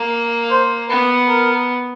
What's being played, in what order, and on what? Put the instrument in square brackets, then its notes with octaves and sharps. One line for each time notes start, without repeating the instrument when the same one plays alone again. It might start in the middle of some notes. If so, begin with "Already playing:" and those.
Already playing: [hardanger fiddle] A#3
[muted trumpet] C5
[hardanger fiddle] B3 [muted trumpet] B4
[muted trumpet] A#4